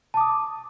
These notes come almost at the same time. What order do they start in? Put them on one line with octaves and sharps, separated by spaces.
A5 D6 D#6